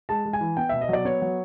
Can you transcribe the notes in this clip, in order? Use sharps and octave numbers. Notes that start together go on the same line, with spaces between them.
G#3 A5
G#3
G#5
E3
B3 G5
B2 E5
D#5
F#3 D5
B3 C#5
F#3